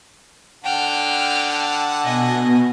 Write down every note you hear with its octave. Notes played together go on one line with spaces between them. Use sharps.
D3 F#5 G5 A5 F6
B2 D#5 G#5